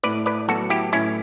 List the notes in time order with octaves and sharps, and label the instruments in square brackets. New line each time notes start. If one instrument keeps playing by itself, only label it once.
[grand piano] A2 [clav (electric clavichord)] B4 D5
[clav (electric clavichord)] B4 D5
[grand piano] F#3 B3 [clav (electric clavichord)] F#4 A4
[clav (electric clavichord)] E4 G4
[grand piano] A2 [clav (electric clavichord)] C#4 E4